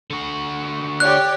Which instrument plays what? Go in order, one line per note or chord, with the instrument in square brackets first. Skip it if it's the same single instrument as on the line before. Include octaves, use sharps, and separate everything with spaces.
[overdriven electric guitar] D3 F#4
[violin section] G4 C#5 D5 [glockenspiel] F#6